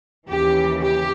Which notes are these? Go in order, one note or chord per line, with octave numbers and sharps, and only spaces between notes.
D#2 C#3 E3 G4
G4